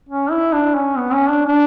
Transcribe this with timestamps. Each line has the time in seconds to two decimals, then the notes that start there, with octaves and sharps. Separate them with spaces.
0.09 C#4
0.31 E4
0.53 D4
0.75 C#4
0.97 B3
1.13 C#4
1.29 D4
1.46 D4